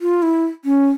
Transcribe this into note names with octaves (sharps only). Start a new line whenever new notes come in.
F4
E4
C#4